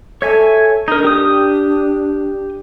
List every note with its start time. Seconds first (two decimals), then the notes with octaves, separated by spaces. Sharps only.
0.22 A4 C#5 E5 G#5
0.88 D4 D#4 A#4
1.04 G4 D#6